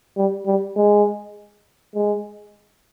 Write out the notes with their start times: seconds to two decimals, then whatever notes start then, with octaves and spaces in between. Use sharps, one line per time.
0.17 G3
0.47 G3
0.76 G#3
1.95 G#3